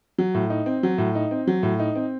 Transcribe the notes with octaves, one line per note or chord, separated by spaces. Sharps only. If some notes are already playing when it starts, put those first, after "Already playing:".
F#3
A2
D#4
C4
F#3
A2
D#4
C4
F#3
A2
D#4
C4